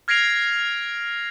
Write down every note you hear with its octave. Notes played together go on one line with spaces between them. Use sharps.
F6 G#6 A#6 C7 D7 F7